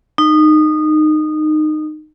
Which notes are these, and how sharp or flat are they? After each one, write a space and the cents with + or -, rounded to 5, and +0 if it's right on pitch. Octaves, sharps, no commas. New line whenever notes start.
D#4 -20